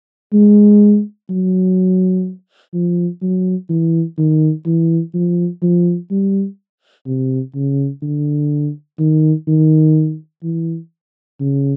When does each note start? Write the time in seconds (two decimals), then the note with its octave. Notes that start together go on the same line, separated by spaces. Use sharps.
0.33 G#3
1.30 F#3
2.74 F3
3.22 F#3
3.69 E3
4.18 D#3
4.66 E3
5.14 F3
5.62 F3
6.11 G3
7.06 C3
7.55 C#3
8.03 D3
8.99 D#3
9.48 D#3
10.43 E3
11.40 C#3